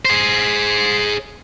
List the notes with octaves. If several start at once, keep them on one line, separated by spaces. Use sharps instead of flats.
G#4 C5